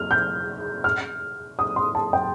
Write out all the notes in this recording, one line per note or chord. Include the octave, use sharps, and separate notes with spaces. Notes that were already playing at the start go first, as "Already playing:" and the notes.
Already playing: F6
G6
F6
D#6
C6
A5
G5